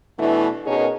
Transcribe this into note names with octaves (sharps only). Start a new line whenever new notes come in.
B2 E3 A3 D4 E4
B2 C#4 D#4 G#4 A#4